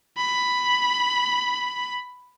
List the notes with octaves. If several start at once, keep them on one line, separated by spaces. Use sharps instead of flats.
B5